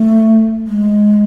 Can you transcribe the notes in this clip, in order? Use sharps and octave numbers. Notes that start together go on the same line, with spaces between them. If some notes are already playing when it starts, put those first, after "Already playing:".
Already playing: A3
G#3